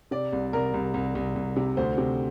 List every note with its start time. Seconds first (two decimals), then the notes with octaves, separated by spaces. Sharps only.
0.11 C3 D5
0.33 C2
0.53 C2 A#4
0.74 C2
0.94 C2
1.15 C2
1.36 C2
1.56 C3
1.77 D2 C5
1.98 C3